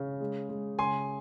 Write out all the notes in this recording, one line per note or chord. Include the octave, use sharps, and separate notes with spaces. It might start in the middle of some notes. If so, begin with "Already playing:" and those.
Already playing: C#3
G#3
G#3
C#3 G#5 C6